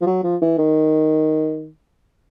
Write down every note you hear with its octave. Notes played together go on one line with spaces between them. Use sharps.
F3
F#3
F3
E3
D#3